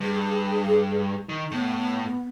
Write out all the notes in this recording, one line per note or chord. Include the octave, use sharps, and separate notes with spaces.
G2 G#4
D#3
A2 B3